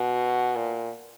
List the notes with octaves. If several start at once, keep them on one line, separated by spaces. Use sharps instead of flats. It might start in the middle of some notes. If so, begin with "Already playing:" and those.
Already playing: B2
A#2